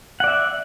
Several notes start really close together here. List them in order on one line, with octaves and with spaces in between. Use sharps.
F#5 D5 E5